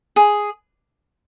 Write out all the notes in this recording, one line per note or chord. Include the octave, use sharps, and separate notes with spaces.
G#4